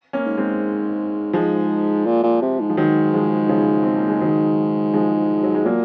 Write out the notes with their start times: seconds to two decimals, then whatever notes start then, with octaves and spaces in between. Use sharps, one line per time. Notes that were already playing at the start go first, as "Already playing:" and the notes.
0.13 A#3 C#4
0.26 G#2
0.38 G#3 C4
1.33 G#2 F3 G#3
2.06 A#2
2.23 A#2
2.42 C3
2.60 G#2
2.70 F3
2.77 G#2 D#3 F#3
3.14 F3 G#3
3.49 C#3 F3
3.83 C4
3.97 A#3
4.09 G#3
4.21 D#3 F#3
4.94 F3 G#3
5.43 F#3
5.55 G#3
5.65 A#2 F#3 A#3